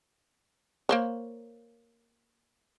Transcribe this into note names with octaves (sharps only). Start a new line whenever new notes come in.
A#3 C5 C#5